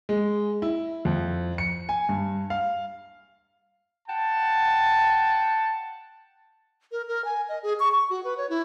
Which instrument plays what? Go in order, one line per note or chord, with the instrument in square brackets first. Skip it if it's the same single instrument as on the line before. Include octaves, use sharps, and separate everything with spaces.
[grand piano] G#3
E4
F2
C#7
G#5
G2
F5
[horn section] F#5 G5 A5
[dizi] A#4
A#4
G#5
D#5
G#4
C#6
C#6
F#4
B4
C#5
E4